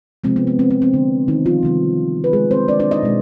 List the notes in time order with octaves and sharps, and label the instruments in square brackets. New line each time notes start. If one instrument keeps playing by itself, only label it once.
[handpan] C3 F3 G#3 C4
B3
B3
C4
C4
C4
D3 D4
D#3 D#4
F3 F4
C3 D#3 G3
B4
G#3 G#4
C4 C5
D4 D5
D4 D5
D#4 D#5
B2 G#3